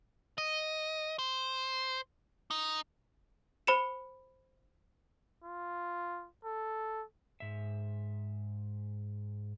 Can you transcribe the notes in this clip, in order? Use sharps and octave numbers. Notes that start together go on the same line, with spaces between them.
D#5
C5
D#4
C5 B5 C#7 E7
F4
A4
G#2 E5